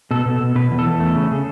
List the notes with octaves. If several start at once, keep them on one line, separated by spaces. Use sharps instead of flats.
B2 A4
B2
B2
B2 B4
E2
A4
E2
A3
C#3
C#3